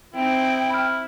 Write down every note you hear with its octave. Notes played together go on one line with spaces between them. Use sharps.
C4 D#4 E4 G5
B5 F6